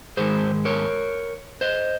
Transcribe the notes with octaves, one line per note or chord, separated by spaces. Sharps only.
G#2 D#3 G#3 G#4 C5
A#4 C#5
C5 D#5